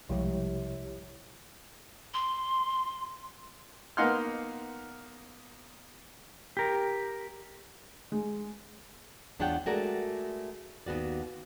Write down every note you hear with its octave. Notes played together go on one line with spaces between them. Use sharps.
B1 C3 F3 G3 G#3 E4 G4 C#5
C6
A#3 B3 D#4 F#5 C6 F6
G4 A#4
G#3
E2 D4 F4 C#5 F#5 G5
G#3 A3 F#4 A#4 D5
D#2 B3 F#4 D5